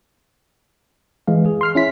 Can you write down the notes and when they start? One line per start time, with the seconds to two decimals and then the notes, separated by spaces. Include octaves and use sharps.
1.27 E3 G#3 F5
1.46 G#4
1.61 C6 F6 C7
1.75 C#4 E4 B6